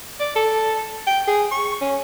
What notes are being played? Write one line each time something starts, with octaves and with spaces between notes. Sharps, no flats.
D5
A4
G5
G#4
C#6
C#4